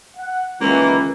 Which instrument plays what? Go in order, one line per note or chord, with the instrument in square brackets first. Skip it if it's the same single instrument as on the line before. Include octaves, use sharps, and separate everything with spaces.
[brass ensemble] F#5
[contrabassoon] C#2 [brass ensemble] D#3 E3 [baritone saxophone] A#3